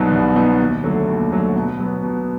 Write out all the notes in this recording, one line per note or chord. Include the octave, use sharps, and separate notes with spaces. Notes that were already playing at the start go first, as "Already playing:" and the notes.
Already playing: C2 B2 F#3 B3 D#4
C2
B2 F#3 B3 D#4
D#2
D3 F#3 A3
D#2
D3 F#3 A3
B2
F#3 B3
B2